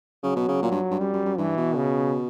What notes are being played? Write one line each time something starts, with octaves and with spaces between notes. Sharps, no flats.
C#3 F#3
B2
C#3
A#2
G2
G2
F#2 G3
F#2
F#2
G2 E3
B2
C#3